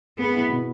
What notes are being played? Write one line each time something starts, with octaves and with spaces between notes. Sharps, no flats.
B3 G#4
E4
B2